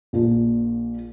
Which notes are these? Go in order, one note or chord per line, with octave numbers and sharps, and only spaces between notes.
A#1 A#2 F3